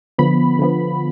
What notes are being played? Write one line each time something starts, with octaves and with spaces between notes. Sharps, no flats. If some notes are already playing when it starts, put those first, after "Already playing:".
D3 F3 B3 B5
D3 F3 B3